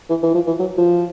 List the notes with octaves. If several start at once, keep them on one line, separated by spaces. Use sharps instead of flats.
E3
E3
F3
E3
F#3
F3